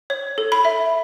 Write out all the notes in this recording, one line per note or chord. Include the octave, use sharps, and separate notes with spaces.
C#5
A4
B5
E5